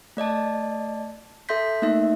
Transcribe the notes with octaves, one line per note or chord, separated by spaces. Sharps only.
A3 D5 D#5 A5
A4 E5 C6 G6 B6
A3 A#3 D#4 E5